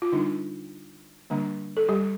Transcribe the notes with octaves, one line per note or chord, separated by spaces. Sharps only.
F4
D3 G3 D4 D#4
D3 G3 A#3 D4
A4
G3 G4